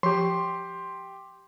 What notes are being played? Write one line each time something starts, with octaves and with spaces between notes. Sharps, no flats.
F3 G4 C6